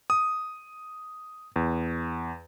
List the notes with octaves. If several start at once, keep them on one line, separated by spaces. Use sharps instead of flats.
D#6
E2